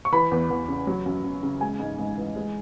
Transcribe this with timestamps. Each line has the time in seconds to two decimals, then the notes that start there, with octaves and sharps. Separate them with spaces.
0.05 C#6
0.12 E3 B5
0.31 E2
0.50 E2
0.68 C#3
0.87 F#3
1.06 F#2
1.24 F#2
1.43 C#3
1.61 G#3 G#5
1.80 G#2
1.99 G#2
2.17 E3
2.36 G#3